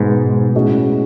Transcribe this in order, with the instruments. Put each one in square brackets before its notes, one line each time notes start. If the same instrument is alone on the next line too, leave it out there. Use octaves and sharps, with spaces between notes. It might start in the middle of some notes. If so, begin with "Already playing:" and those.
Already playing: [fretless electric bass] G#2 [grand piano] B2 G#3 B3 D#4 F#4
[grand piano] A2 G#3 C#4 F#4